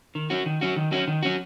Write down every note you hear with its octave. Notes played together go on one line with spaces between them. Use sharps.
D#3
F#3 C#4 F#4
D#3
F#3 C#4 F#4
D#3
F#3 C#4 F#4
D#3
F#3 C#4 F#4